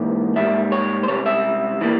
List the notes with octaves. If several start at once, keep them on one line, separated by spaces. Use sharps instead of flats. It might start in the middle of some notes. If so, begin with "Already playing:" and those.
Already playing: G#2 E3 A#3
G#2 G3 A#3 E5
C#5
C5
C#2 C3 G3 C#5
E5
E3 G3 A#3